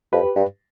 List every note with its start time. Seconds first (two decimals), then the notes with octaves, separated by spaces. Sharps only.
0.12 F2 G4 B4
0.36 G2